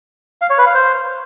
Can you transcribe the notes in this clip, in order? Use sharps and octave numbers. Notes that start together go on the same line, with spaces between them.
F5
C#5
B4
F5
C5